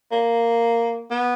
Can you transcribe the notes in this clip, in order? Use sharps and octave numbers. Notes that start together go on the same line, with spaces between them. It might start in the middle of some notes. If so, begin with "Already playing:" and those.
A#3
B3